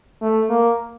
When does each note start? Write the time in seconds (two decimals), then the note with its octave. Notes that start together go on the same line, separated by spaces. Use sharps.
0.22 A3
0.50 A#3